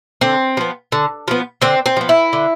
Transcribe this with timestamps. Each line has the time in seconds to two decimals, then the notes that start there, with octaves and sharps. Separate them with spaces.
0.21 D3 C4
0.57 F3 B3
0.92 D3
1.28 F3 B3
1.61 D3 C4
1.86 C4
1.97 F3 B3
2.09 E4
2.33 D3